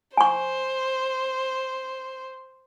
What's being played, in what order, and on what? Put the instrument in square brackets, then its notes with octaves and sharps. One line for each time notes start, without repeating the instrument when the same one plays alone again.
[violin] C5 [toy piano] G#5 C#6